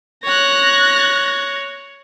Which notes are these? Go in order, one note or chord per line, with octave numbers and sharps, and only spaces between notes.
C#5 F#6 A#6